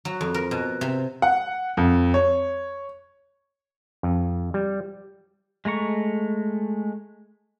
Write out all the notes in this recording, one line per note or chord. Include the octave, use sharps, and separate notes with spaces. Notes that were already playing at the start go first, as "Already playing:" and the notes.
F#3
F2
A#4
B2
C3
F#5
F2
C#5
F2
G3
G#3 A3 A#5 C#6